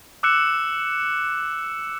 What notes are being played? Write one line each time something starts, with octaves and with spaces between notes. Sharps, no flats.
D6 E6 F#6 C#7 E7